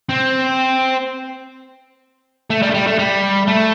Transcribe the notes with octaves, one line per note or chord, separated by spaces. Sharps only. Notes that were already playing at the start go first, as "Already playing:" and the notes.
C4
A3
G3
A3
G3
A3
G3
A3